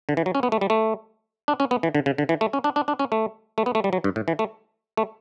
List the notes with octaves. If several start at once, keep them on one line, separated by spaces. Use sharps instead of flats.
D3
E3
F#3
C#4
B3
A3
G3
A3
D4
C#4
B3
E3
D3
C#3
D3
E3
A3
C#4
D4
D4
D4
C#4
A3
A3
B3
A3
G3
F#3
G2
A2
E3
A3
A3